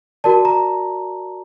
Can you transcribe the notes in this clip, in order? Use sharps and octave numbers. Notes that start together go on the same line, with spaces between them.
F#4 A#4 D5 A5
A#5